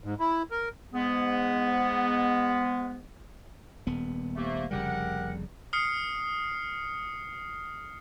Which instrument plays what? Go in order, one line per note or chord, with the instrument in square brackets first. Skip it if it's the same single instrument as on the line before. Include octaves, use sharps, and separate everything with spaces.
[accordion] G#2
E4
A#4
[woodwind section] G#2 G#3 B3
[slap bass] D#1 B3
[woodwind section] C3 A3 A#3
[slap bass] F1 C#3 G3 [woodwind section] G4 A#4 F#5
[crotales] D#6 F6 C7 C#7